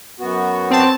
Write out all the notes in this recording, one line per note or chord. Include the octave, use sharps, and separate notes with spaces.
F#2 B3 F#4
C4 A5